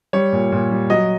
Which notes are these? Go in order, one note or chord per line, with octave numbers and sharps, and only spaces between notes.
G3 C#5
A#2
A#2
G3
F#3 D#5